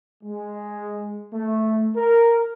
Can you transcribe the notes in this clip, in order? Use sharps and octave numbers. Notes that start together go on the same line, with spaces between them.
G#3
A3
A#4